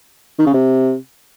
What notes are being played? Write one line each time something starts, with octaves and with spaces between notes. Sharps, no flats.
D#3
C#3
C3